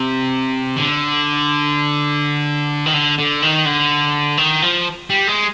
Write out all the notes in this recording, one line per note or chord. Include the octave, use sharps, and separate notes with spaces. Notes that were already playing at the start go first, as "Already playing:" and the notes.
Already playing: C3
D3
D#3
D3
D3
D#3
D3
D#3
F3
G3
G#3